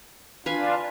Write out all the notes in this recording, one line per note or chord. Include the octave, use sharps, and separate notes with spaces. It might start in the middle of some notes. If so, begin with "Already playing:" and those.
D4 F4 B4 F5 G#5